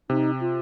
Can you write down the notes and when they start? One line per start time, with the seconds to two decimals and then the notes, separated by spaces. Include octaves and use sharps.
0.10 C3 D#4
0.40 F4